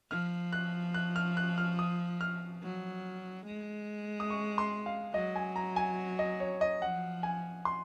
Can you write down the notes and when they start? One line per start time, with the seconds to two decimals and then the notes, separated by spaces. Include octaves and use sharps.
0.11 F3 F6
0.53 F#6
0.94 F#6
1.16 F6
1.37 F#6
1.58 F6
1.79 D#6
2.21 F6
2.63 F#3
3.46 G#3
4.20 D#6
4.30 C#6
4.58 C6
4.86 F5
5.14 F#3 D#5
5.36 G#5
5.56 A#5
5.76 G#5
6.19 D#5
6.40 C#5
6.61 D#5
6.82 F3 F#5
7.23 G#5
7.65 C6